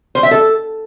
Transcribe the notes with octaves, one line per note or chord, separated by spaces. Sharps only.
C5
E5
A4